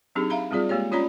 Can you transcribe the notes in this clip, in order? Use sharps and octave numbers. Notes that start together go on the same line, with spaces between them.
F#3 C4 D4 D#4 G4 G#4
E5 F5 A#5 B5
G3 C4 F4 G#4 D5
G#3 A#3 G4 C#5
C#4 F4 C#5 D5 A#5 B5